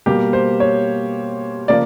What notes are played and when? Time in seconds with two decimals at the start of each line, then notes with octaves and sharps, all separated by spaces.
0.06 B2 G3 A#3 G4
0.33 C5
0.60 C#5
1.68 C#3 F3 A#3 D5